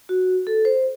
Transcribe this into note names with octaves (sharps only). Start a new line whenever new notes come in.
F#4
A4
C5